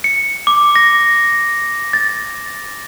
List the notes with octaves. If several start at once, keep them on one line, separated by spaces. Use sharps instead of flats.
C#7
D6
A#6
A6